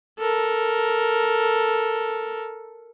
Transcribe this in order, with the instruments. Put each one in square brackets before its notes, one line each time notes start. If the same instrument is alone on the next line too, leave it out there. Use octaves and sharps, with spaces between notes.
[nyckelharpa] A4 A#4